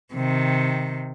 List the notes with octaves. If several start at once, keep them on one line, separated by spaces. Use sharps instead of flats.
C3 D#3